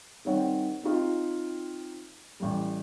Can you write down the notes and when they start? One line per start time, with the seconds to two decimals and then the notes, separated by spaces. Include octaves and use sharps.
0.25 D#3 G3 C4 C#5 F#5
0.83 C4 D#4 F4
2.40 A1 G3